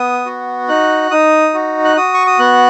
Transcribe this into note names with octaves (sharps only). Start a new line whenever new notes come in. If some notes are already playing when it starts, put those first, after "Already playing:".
Already playing: B3 D#6
F#4
D#4 F#6
D#4 D#6
F#4
F#6
F#4 D#6
C#6
D#6
B3 F#6